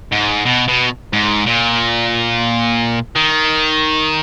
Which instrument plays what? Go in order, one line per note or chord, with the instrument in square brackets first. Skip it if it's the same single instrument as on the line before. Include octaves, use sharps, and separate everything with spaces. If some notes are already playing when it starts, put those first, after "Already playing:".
[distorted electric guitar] G#2
B2
B2
G#2
A#2
D#3